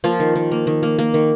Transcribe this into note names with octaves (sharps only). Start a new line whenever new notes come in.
F3 A#3 F4
D#3
D#3
A#3
D#3
A#3
A#3
D#3